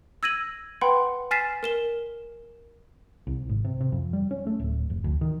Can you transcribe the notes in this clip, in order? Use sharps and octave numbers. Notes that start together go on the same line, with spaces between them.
E6 G#6 A#6 D#7 F#7
B4 F#5 G5 B5 C6
G#5 F6 A6 B6 C7 E7
A#4 E7 G7
C2
G#1
C3
C3
F2
G3
C#4
A3
D1
F1
D2
D#3